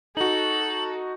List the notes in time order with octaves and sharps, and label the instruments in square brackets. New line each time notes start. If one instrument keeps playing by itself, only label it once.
[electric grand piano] D#4 F#4 [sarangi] A4 [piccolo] F#7